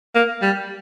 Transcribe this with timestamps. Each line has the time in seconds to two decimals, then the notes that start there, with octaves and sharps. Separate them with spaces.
0.15 A#3
0.42 G3